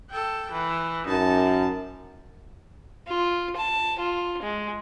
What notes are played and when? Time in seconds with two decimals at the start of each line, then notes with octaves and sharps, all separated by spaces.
0.11 A4 G5
0.52 E3
1.07 F#2 D#4 A5
3.07 F4
3.56 A5
3.99 F4
4.42 G#3